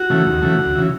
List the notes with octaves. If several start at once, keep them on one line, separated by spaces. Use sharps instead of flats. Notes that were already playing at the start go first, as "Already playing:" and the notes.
Already playing: F#4
C#3 E3 A3
D#2
C#3 E3 A3
D2
C#3 E3